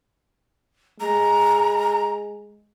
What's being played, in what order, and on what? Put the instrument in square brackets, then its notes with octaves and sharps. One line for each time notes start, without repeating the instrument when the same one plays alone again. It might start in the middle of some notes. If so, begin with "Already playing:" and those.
[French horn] G#3 [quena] A#5